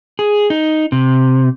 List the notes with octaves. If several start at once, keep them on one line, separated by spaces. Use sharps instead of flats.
G#4
D#4
C3